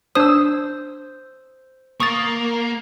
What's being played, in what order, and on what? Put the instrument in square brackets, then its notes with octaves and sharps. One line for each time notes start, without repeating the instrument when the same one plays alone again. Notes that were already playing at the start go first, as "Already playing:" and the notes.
[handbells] D4 D#6 [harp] C5 E6
[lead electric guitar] A#3 [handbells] C#6 D#6 A6